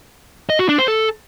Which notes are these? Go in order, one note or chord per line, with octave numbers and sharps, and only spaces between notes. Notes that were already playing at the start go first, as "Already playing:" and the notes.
D#5
F#4
D4
C5
A4